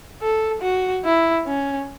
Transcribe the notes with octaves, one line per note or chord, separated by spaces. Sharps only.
A4
F#4
E4
C#4